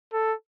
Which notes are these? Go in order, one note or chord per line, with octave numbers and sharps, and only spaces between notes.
A4